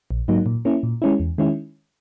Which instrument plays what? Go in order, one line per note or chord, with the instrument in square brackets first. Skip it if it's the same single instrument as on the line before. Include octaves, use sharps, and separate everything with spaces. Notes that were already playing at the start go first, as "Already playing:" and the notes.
[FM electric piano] A#1
G#2 F#3 A#3 D#4
A#2
A#3 C#4 E4
A#2
G#3 C#4 E4
E2
D#3 G#3 C#4 E4